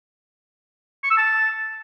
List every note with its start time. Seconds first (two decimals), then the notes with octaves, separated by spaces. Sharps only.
1.04 C#6
1.11 E6
1.17 A5